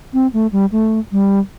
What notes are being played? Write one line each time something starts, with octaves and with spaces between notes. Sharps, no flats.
C4
A3
G3
A3
G3